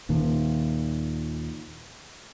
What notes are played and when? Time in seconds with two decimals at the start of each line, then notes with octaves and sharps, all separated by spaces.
0.09 D#2 A#2 D#3